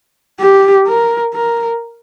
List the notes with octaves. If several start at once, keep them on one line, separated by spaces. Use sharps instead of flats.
G4
A#4
A#4